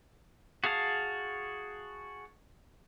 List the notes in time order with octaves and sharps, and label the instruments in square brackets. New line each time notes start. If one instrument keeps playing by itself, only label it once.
[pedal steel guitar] F#4 G#4 F5 A5